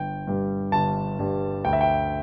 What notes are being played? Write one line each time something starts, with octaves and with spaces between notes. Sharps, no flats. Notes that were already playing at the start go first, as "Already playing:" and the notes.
Already playing: G1 G5
G2 G3
G1 A5
G2 G3
D2 G5
E5
G5